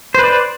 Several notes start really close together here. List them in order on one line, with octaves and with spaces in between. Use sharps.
C5 B4 D5